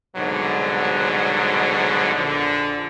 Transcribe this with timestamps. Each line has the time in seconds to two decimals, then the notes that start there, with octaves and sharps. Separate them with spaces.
0.16 C2 G#2 B2 D3 F#3
2.15 A#1 D3